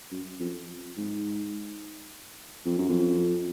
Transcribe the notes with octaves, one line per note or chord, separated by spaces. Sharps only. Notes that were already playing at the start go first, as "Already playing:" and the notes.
F#2
F2
G#2
F2
F#2
F2